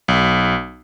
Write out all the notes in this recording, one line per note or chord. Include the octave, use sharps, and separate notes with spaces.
B1